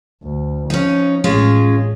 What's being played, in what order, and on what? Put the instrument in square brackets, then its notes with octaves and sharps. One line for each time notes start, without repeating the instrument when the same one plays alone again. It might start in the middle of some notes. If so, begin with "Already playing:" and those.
[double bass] D2
[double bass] F3 [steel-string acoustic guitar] C#4 D#4
[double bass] A1 A2 [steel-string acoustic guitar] G#3 C#4 F4